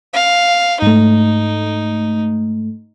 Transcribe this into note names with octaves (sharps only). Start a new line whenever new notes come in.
F5
G#2 A3 D#4